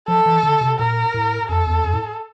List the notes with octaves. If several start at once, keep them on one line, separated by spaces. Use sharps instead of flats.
F3 A4
E3
D3
C3
A#2 A#4
A2
F2 A4
E2
F2
A2